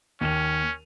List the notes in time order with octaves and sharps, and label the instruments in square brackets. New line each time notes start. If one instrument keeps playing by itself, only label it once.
[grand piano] D#2 D#7 F7 [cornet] C#4